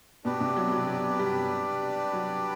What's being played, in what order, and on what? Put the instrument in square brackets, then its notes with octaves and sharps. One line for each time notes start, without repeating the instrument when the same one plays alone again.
[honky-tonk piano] B2 [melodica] D4 G4 B4 D5
[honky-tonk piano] C3
F#3
F#3
F#3
G3
F#3